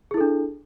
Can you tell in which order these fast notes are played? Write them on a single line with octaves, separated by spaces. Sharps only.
G#4 E4 A4 D4